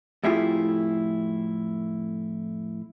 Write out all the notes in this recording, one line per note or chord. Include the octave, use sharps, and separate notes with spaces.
F2 A2 E4 F4 G4 G#4